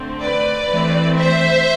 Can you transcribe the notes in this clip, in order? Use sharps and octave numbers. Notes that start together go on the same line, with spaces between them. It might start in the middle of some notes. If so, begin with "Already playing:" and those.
Already playing: D3 A3 C4
B4 D5
E3 A3 C4
C5 E5